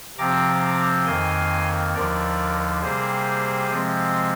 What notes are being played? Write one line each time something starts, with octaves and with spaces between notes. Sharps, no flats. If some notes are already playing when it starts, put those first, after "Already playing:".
C3 F3 C4 A#5 D6
F2 D#3 A#3 G#5 C6
D#2 D3 F3 A#4 D5
C3 G3 A#3 G#4 C5
C3 F3 G#3 C4